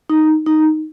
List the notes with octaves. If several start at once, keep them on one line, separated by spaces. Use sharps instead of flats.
D#4
D#4